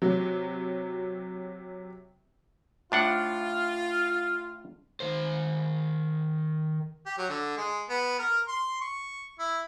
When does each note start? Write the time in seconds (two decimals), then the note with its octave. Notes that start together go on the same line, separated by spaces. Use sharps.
0.02 C3 F#3
2.92 A2 D4 F4 F#5
5.00 D#3 C5
7.06 G4
7.18 F#3
7.30 D3
7.57 G#3
7.89 B3
8.19 A#4
8.48 C6
8.81 C#6
9.39 E4